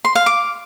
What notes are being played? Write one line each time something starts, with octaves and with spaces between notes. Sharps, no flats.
C6
F5
D6